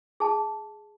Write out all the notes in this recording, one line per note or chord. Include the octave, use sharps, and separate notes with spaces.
G#4 A5